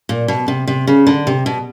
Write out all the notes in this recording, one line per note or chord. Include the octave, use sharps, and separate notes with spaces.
A#2
B2
C3
C3
C#3
D3
C3
B2